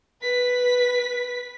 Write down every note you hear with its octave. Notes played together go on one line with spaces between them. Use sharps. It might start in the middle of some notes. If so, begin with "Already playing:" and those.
B4 B6